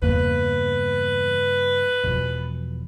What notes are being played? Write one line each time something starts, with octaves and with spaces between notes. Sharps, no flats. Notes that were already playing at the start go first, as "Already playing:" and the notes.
E2 G2 C#3 A#3 B4
E1 E2 B2 F3 F4